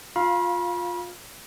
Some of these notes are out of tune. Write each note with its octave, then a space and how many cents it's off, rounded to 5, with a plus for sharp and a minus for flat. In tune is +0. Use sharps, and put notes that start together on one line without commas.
F4 +15 F5 +0 B5 -35